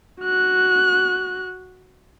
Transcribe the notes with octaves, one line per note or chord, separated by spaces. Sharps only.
F#4 F#6